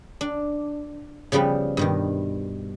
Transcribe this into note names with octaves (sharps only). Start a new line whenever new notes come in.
D4
C#3 F3 G3 B3 B4
G2 B2 D#3